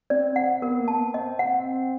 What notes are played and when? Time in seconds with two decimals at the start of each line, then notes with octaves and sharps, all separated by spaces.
0.10 C4 D5
0.36 F#5
0.62 B3 A#4
0.80 A#3
0.88 A5
0.97 B3
1.14 C4 D#5
1.39 F#5